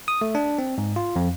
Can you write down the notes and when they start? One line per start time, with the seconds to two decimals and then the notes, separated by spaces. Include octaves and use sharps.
0.08 D#6
0.21 A3
0.35 D4
0.58 C4
0.78 G#2
0.96 F4
1.16 F2